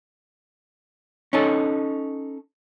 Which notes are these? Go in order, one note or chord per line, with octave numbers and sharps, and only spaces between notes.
C#4 D#4 A4